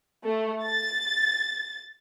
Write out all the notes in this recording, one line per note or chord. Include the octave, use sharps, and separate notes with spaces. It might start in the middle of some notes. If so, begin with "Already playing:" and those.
A3
A6